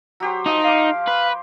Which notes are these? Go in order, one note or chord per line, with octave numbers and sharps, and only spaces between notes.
F#3 G4 C5
F3 D#4 D#6
F5 C6 D6
B4